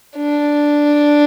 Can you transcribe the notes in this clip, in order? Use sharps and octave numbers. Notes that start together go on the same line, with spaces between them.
D4